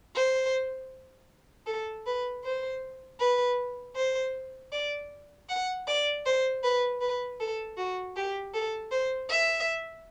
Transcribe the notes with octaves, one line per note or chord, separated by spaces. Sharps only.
C5
A4
B4
C5
B4
C5
D5
F#5
D5
C5
B4
B4
A4
F#4
G4
A4
C5
E5